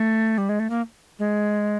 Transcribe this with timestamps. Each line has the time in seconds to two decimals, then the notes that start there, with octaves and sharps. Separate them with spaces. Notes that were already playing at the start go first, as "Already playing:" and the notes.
Already playing: A3
0.38 G3
0.49 G#3
0.59 A3
0.70 A#3
1.19 G#3